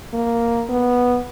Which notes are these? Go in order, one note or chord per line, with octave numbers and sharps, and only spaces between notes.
A#3
B3